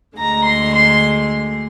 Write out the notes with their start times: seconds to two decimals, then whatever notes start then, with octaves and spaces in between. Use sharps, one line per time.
0.17 D2 D3 G#3 A#5
0.45 C6
0.74 C6